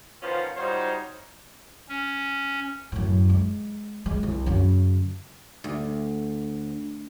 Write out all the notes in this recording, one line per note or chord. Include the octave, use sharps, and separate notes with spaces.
D#3 F3 B3 C#4 F4 C5
G3 D#4 F4 F#4 C5 C#5
C#4
F#2 A2
G#3
G#3
C2
F#2 C#3
D2